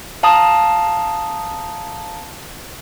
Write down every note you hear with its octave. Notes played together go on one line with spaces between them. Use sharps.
F5 A5 A#5 D#6